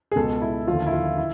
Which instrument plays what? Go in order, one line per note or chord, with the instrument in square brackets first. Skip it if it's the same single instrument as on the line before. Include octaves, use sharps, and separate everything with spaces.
[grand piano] G#4
C#2 B2 A4
E4
D#2 D3 F3 F4
E4
F4
E4